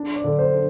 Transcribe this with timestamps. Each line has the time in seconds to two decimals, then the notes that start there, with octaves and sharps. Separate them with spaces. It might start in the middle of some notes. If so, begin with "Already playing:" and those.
Already playing: D4
0.16 D5
0.24 D3
0.39 C5
0.53 D4